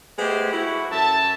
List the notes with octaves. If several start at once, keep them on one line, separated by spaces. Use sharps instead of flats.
G#3 A3 B3 G4 C5
E4 F#4
F#2 A4 E5 A5